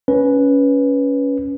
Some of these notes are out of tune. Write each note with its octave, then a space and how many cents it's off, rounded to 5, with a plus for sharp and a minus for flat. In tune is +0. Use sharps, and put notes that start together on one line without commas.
C#4 +10 B4 -5